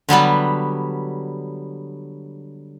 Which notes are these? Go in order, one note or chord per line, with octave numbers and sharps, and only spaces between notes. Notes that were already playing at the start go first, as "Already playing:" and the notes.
D3 F#3 G3 B3